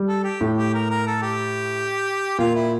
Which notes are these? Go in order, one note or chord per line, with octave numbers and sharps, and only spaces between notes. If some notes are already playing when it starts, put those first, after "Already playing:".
Already playing: G3
A4
G4
A2
G4
A#4
A#4
A4
G4
A#2 F4
E4